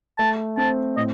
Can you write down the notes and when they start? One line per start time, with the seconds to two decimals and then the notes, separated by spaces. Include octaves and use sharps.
0.18 A3 A5
0.57 C4 A5
0.97 A2 D#5